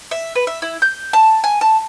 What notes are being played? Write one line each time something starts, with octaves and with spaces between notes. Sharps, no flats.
E5
B4
E5
E4
G6
A5
G#5
A5